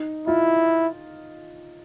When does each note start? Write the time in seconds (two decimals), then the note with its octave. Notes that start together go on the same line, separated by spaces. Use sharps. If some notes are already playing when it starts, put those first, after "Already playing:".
Already playing: D#4
0.27 E4 F4